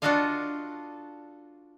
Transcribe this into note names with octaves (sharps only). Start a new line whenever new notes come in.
D4 F4 F#4 A4 D#5 F5